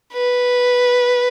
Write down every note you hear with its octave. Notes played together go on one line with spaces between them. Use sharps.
B4